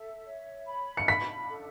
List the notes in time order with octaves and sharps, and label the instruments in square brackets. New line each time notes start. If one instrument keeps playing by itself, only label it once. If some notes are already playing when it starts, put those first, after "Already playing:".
Already playing: [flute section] A4 E5
C#5
B5
[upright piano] C#7
[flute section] D4 [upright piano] B6
[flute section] A4